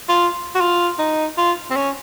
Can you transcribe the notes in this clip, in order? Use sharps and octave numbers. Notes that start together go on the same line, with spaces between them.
F4
F#4
F4
D#4
F4
C4
C#4